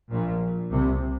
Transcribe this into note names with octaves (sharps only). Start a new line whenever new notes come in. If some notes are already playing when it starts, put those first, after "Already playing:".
A#1 A#2
C2 C3